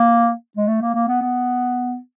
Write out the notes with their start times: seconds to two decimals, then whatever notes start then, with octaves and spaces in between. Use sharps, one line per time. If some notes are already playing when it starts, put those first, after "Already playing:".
Already playing: A#3
0.57 G#3
0.67 A3
0.82 A#3
0.94 A#3
1.08 B3
1.22 B3